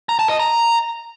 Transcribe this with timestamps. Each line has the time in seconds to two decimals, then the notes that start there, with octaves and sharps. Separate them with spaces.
0.09 A#5
0.19 A5
0.29 D#5
0.40 A#5